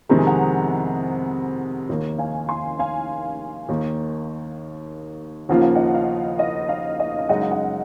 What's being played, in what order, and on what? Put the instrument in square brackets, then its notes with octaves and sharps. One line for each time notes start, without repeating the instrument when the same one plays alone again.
[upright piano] F2 C3 D#3 G#3 [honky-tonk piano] A#5
[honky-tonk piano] G#5
F#5 A#5
[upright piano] D#2 D#3 A#3
[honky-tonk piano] F5 G#5
G#5 C6
F5 G#5
[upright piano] D#2 D#3 A#3
[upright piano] D#2 C#3 F3 A#3 F4 [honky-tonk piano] F#5
[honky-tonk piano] F5
D#5 F#5
F5
D#5
F5
D#5
F5
[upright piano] F#2 C#3 G#3 D#4 [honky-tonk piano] D#5 F#5
[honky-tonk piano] F5
D#5 F#5